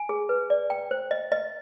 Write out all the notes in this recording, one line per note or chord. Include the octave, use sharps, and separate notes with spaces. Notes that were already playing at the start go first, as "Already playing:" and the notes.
Already playing: G#5
G#4
B4
D5
G5
C5
D#5
D#5